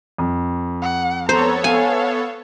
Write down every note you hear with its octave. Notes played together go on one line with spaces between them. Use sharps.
F2
F#5
B3 A4 C5 C#5 A#5
F5 G#5